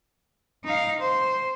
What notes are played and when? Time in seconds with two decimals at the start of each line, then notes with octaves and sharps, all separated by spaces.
0.64 D#4 F5
1.01 C5